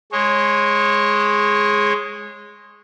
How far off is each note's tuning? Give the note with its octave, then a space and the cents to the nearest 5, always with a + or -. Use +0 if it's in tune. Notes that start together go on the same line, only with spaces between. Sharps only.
G#3 +0 C#5 -25